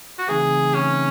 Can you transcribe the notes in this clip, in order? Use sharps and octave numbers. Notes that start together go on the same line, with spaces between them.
F#4
C#3 E3 A3 C4 D#4 G#4
C#4